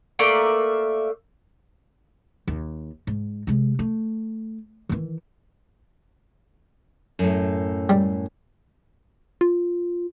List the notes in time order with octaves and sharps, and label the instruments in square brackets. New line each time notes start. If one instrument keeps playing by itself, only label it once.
[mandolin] A3 A#3 D5 E5
[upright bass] D#2
G#2
C3 G#3
A3
D#3 E3
[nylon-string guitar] F#2 A2
[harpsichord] G3
[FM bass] F4